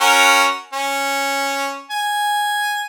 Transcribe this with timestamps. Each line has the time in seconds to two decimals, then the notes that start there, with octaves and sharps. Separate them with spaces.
0.01 C#4 F#4 A#4
0.73 C#4
1.91 G#5